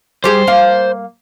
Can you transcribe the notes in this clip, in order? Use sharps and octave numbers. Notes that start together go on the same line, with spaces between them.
G3 G4 G#4 C5
A#3 F5